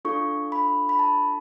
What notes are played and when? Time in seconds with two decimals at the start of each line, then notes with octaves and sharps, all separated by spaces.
0.05 D4 F4 A4 C#6
0.52 B5
0.89 B5
0.99 A5